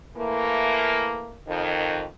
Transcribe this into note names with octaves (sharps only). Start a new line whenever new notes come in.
E3 A3 A#3
F2 D#3